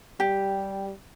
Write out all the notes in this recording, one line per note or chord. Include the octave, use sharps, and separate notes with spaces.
G3 G4